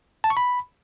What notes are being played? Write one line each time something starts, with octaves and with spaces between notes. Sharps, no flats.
A5
C#6
B5